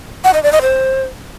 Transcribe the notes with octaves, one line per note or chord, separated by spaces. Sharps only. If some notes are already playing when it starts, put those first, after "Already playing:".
F#5
D#5
D5
D#5
C5